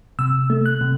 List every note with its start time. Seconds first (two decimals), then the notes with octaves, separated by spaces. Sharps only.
0.19 C3 E6
0.50 A3
0.66 F#6
0.81 C3